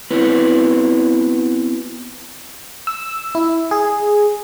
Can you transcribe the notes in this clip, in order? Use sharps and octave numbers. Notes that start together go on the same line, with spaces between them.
B3 C4 E4 F#4 B4
E6
E4
G#4